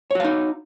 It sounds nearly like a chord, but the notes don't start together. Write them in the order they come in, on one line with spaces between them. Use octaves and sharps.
C#5 F#4 F5 D#4